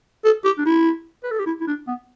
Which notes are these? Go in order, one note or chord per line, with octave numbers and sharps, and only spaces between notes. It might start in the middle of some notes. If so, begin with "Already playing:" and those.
A4
G4
D4
E4
B4
A4
G4
E4
E4
D4
B3